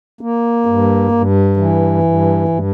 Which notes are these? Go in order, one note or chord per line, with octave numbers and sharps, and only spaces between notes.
A#3
G2
G2
E3
G2
G2